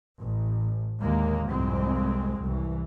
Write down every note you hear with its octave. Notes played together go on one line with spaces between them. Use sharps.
A1
D#2 D3 G#3 A#3
C2 F2 G#2 G#3 C4
C2 E3